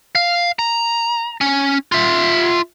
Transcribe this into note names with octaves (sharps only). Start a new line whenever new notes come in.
F5
A#5
C#4
F4 E5